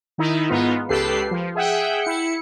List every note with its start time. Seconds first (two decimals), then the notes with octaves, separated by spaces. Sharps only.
0.18 D#3 D#4 E4
0.49 G#2 B3 D#4 F4
0.89 C#2 G4 A4 B4 C7
1.31 F3
1.55 G#4 E5 F#5 G5
2.02 E4 C#7